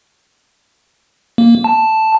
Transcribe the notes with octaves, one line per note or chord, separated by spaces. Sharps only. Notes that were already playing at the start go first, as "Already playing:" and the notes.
A#3
A5